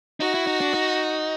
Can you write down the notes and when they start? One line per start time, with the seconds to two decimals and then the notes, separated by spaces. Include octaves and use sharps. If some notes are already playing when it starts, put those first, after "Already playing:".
0.20 D#4 F#4
0.34 E4
0.47 D#4
0.61 D4
0.74 D#4